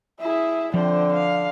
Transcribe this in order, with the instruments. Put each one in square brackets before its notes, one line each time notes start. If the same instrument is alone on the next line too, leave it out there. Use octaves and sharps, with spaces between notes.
[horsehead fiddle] E4 G#4 [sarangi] E5
[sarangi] D3 [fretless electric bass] F3 [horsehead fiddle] C4 G5
[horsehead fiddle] F5